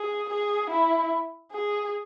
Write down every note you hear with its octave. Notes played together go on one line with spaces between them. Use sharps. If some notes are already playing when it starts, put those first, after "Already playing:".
Already playing: G#4
G#4
E4
G#4